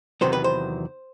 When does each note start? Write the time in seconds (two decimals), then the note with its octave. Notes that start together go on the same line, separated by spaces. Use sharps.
0.21 E2 C3 D#3 F#3 B3 C5
0.33 B4
0.44 C5